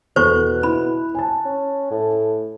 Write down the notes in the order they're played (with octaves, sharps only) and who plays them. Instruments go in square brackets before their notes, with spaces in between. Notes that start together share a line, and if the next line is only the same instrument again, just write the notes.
[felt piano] E2 A4 F#6 [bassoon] B2 [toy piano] C5 C#6
[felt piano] E4 [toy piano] B5
[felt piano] G#5 A5
[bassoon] C#4
A2